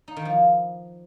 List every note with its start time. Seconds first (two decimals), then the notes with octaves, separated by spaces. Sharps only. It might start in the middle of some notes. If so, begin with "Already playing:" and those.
0.08 D#4
0.16 D#3
0.25 F3